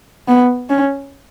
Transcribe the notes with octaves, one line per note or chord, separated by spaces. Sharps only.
B3
C#4